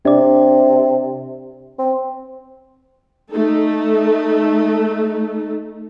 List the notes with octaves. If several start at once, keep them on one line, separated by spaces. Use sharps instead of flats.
C3 D4 D5
C4
A3 D#4 A4